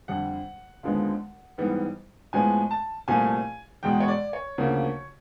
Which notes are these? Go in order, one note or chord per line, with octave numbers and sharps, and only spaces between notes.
F2 D3 G3 F#5
D#2 D3 F3 G#3 B3
G#2 E3 G3 B3
A2 F3 G#3 B3 G#5
A5
C2 A#2 F3 A3 G#5
E2 B2 G#3 G5
C#5
D5
C#5
D2 C#3 F3 A#3